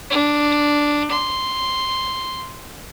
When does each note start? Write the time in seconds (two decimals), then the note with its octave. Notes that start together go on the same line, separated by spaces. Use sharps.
0.10 D4
1.11 C6